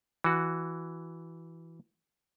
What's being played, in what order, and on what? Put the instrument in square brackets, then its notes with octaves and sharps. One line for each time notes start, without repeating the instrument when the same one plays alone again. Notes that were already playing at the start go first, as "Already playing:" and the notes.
[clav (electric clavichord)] E3 F#4